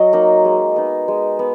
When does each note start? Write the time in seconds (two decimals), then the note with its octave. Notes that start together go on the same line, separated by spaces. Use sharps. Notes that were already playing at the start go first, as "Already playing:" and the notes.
Already playing: F#3 D#5
0.13 A#3 D#4
0.45 G#3
0.76 B3 D#4
1.08 G#3
1.39 B3